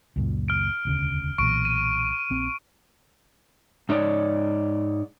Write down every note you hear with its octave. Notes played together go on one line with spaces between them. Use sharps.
C#2 F#2 A#2
F6 D7
E1 D2 C#3
B1 A#2 E3 C#6 D7
D#7
A#1 C4
G#2 D#4 C#5 D5